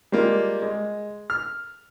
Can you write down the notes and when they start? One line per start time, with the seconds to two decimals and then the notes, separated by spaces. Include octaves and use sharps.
0.12 G3 G#3 A#3 F4
0.62 G#3
1.30 F6